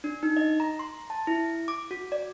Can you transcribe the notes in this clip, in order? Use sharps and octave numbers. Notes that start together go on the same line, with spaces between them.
D4
D#4
D#5
A#5
C6
A5
E4
D6
F#4
D5